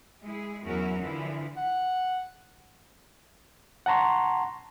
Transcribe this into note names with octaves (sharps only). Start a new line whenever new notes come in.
G#3 E4 G#4
E2 F#3 C#4 E4 F#4 A#4
D3 E3 F3 E4
F#5
F#5 A5 A#5 C6 C#6